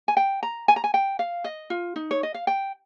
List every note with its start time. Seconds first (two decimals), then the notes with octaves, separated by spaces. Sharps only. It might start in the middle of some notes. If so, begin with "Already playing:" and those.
0.08 G#5
0.17 G5
0.43 A#5
0.68 G#5
0.76 A#5
0.84 G#5
0.94 G5
1.19 F5
1.44 D#5
1.70 F4
1.96 D#4
2.11 C#5
2.23 D#5
2.34 F5
2.47 G5